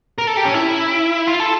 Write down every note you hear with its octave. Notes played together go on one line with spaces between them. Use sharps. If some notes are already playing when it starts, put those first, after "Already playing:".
A#4
A4
G4
C#4
E4
F4
A4